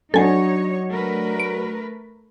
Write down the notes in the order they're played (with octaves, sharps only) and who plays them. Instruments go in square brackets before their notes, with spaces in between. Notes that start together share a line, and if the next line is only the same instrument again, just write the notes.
[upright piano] F#3 D4 F#5 [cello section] D#4 C#5 [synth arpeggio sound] A4 G#5
[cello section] A3 A#4 B4
[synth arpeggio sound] D7